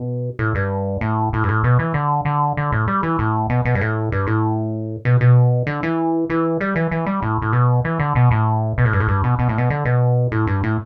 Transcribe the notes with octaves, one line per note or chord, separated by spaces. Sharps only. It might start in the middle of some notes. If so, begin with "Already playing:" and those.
Already playing: B2
A2
G2
A2
A2
G2
A2
B2
E3
D3
D3
D3
A2
G3
E3
A2
B2
B2
G2
A2
G2
A2
B2
B2
D3
E3
E3
G3
E3
E3
G3
A2
A2
B2
E3
D3
B2
A2
B2
A2
G2
A2
G2
B2
B2
A2
B2
D3
B2
A2
G2
A2